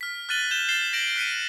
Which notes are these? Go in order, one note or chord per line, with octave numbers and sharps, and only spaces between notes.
F6 B6
F6 F#6 A6 D#7 F#7 G7
G6 E7 G7
A6 C7 E7 G7
G6 A#6 D7 F#7
F#6 B6 C#7 D#7